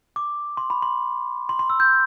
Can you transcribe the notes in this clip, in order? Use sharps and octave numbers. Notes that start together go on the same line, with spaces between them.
D6
C6
B5
C6
C6
C6
E6
G6